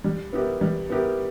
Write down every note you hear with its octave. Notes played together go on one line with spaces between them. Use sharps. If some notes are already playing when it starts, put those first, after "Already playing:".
G3
B3 E4 G4 A#4
G3
B3 E4 G4 A#4